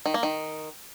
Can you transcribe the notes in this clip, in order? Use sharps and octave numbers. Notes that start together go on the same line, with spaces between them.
D#3
A#3
D#3